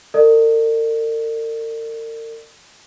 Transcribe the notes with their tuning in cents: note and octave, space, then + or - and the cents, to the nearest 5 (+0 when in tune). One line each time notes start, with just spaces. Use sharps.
A#4 -45 D5 +40